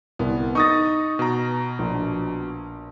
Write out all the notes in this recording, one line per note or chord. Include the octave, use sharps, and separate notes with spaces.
C2 B3
D#4 C#6 D#6 A6 A#6
B2 A#5
A#1